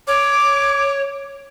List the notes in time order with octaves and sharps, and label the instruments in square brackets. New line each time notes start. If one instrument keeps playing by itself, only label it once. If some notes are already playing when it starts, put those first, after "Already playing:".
[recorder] C#5 [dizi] D6